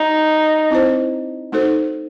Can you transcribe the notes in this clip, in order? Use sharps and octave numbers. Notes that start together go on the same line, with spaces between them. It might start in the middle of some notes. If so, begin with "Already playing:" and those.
Already playing: D#4
C4 E4 C5
A3 D#4 F#4 A4 C5